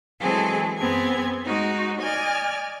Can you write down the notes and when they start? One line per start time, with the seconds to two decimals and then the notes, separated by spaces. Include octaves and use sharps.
0.20 E3 F#3 G#3 C4 G#4 A4
0.79 F#2 B3 C4 G#4 G#6
1.45 G#3 D#4 F#4
2.01 D5 D#5 G#5 F6